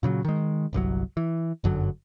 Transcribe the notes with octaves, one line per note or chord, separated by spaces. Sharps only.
A#2 C#3 F3 F#3
D#3 G#3
G1 C2 C#3 F#3
E3
G1 F#2 D3 F#3